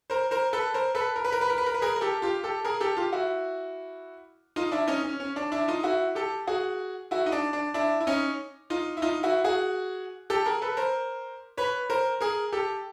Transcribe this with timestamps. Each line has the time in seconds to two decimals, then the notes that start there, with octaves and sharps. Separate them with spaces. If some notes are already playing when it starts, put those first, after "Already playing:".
0.10 A#4 C5
0.31 A#4 C5
0.53 A4 B4
0.74 A#4 C5
0.95 A4 B4
1.16 A#4
1.25 B4
1.32 A#4
1.41 B4
1.50 A#4
1.58 B4
1.66 A#4
1.74 B4
1.82 G#4 A#4
1.96 A#4
2.01 G4 A4
2.22 F4 G4
2.43 G4 A4
2.65 G#4 A#4
2.80 G4 A4
2.97 F4 G4
3.13 E4 F#4
4.56 D#4 F4
4.72 D4 E4
4.88 C#4 D#4
5.03 C#4
5.20 C#4
5.36 D4
5.52 D4 E4
5.68 D#4 F4
5.83 E4 F#4
6.15 G4 A4
6.47 F#4 G#4
7.11 E4 F#4
7.26 D#4
7.32 D4
7.53 D4
7.74 D4 E4
8.00 E4
8.07 C#4 D#4
8.70 D#4 F4
8.97 E4
9.02 D#4 F4
9.23 E4 F#4
9.44 F#4 G#4
10.30 G4 A4
10.46 G#4 A#4
10.62 A4 B4
10.77 A#4 C5
11.57 B4 C#5
11.90 A#4 C5
12.21 G#4 A#4
12.52 G4 A4